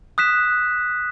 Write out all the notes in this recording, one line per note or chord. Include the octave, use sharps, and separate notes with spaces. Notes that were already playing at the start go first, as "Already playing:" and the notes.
D#6 F#6 B6 E7